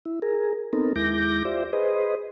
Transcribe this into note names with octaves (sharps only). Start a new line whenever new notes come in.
E4
G#4 A#4
B3 C4 D#4 A4 A#4
D#2 G#3 E4 D6 G6 A#6
F4 G4 C5 D5 E5
G#4 B4 C5 D#5